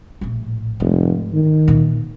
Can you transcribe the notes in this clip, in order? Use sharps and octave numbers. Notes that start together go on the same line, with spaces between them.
A#1 A2
F1 G#2
D#3
A#2 E3